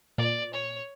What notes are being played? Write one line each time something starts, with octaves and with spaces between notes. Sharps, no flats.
A#2 D5
C#5